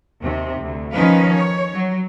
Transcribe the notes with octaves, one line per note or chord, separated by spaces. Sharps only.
D#2 C3
D2
D#3 F3 C#4 D#4 B4 F5
C#5
F#3